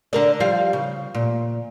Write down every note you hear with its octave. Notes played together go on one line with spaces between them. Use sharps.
D3 A#4 D5
F3 G3 F5
C#3
A#2